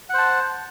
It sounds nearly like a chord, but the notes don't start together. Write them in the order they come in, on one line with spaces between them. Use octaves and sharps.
F#5 C5 A5